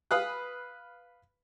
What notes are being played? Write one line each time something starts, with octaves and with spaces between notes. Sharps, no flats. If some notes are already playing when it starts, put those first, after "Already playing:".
B4 F5 B5 D#6 F#6